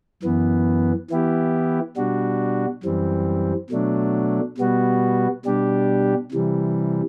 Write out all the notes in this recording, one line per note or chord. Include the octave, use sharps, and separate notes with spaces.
F#2 E3 B3
E3 B3 E4 G4
B2 G3 D4 F#4
F#2 E3 G3 C4
B2 F#3 A3 D4
B2 G3 B3 F#4
B2 G3 D4 G4
C3 E3 G3